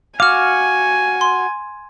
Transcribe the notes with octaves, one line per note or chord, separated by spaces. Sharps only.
F#4 F5 G#5 D6 F6
C6